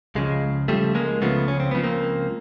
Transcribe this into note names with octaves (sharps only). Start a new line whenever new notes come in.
C#2 C#3 F3 G#3
C#2 C#3 F3 G3 A3
G#3 A#3
C#2 C#3 F3 A3 B3
C#4
C4
C#2 C#3 F3 B3
A#3 C4